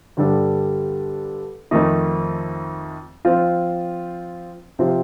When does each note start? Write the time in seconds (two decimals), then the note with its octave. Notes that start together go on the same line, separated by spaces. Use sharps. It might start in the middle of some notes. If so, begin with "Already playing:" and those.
0.17 G2 D3 G3 D4 A4
1.71 F2 D#3 A3 D#4
3.25 F3 C4 F4 C5
4.79 C3 F3 C4 F4 C5